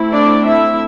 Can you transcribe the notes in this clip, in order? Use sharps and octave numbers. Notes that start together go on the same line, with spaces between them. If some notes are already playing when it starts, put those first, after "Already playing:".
Already playing: A3 C4 E4
D4 D5
E4 E5